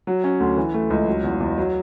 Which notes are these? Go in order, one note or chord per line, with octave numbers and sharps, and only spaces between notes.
F#3
C#4
D2
E3
A3
C#2
F#3
E2
E2
F#3